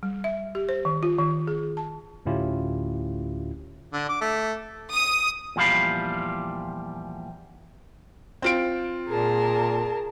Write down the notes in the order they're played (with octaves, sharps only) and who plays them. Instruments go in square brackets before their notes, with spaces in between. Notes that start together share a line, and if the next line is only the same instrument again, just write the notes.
[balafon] G3
E5
G4
C5
D#3
F4
D#3
G#4
A5
[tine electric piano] D2 A2 C#4 E4 F4 G4
[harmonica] D3
D6
A3
[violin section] D#6
[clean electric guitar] E2 A#2 F3 G3 F5 B5
[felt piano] C4 F4 D7
[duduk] A#2 [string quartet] G#4 A#4 A5